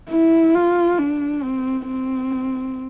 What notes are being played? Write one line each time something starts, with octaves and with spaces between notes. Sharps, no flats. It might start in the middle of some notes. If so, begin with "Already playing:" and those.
E4
F4
D4
C4
C4